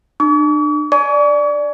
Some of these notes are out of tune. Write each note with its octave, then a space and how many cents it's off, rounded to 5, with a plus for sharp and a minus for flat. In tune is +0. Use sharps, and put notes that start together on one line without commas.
D4 +40 C#6 +45
D5 +0 G#5 +30 C#6 +40